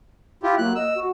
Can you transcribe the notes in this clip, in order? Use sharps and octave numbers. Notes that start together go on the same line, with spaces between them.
E4 F4 G4
F#3 A#3 F#6
D#5 E6
F#4